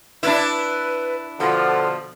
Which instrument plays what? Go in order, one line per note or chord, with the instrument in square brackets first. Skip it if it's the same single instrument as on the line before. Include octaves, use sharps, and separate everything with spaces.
[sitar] D4 E4 [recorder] B4
[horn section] B2 D3 F3 [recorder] A4